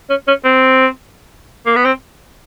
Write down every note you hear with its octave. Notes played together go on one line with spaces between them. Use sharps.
C#4
C#4
C4
A#3
B3
C4